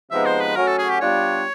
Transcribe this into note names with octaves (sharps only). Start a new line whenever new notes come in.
C3 F3 G#3 B3 D#4 E5
C5
B4
F#3 A3 C#4 F#4 A#4
A4
G#4
G4
G3 B3 D4 F4 C#5